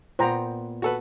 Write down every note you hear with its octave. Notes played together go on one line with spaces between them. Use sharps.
A#2 B3 C5 G5 A#5
F#4 A4 B4